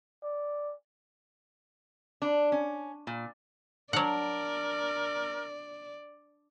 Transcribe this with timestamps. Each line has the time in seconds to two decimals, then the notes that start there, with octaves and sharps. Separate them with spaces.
0.24 D5
2.22 D4
2.52 C#4
3.07 A#2
3.93 F#3 D4 A#4 D5 F#5